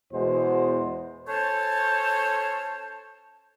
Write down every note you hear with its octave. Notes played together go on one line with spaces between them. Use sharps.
E2 B2 G#3 C5
C#4 A4 C5 C#5 A5